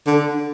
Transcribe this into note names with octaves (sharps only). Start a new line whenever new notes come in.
D3